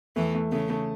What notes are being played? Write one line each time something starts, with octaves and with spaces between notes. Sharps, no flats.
E2 E3 A3
A3
C#3 A3
A3